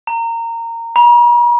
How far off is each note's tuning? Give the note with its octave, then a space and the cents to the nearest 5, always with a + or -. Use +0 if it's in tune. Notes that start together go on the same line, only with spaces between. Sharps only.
A#5 -20
A#5 +45